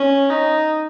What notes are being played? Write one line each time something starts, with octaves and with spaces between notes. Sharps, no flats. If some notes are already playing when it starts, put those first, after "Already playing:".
Already playing: C#4
D#4